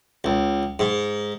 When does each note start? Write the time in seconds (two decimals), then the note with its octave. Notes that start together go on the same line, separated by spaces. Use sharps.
0.24 C#2
0.79 G#2